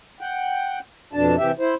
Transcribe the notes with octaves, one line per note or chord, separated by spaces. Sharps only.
F#5 G5
F2 B2 D4 A5
C3 E3 G4 E5
E4 C5